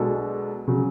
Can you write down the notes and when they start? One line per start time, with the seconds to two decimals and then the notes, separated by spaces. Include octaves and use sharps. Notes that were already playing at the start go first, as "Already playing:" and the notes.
Already playing: B1 B2 G#3 D4 A4
0.68 C#3 F#3